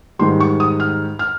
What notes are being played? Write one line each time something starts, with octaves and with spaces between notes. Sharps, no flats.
G#2 D#3 G3 C6
C#6
D#6
F6
F6